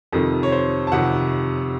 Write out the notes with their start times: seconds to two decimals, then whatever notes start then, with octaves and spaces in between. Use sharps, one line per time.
0.12 F2 C3 D#3 A4
0.43 C#5
0.52 C5
0.87 A5
0.92 F2 C3 D#3 F#5